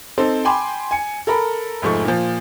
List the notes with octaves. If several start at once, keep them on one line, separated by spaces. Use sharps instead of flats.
C4 D#4 A4 C5
G5 G#5 B5 C6 D6
G#5 C#7
A4 A#4 A#5 B5
F1 G#2 F3 A3 C#6
A#2 F3